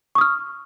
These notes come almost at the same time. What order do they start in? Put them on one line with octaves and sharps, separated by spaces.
C#6 D#6 F6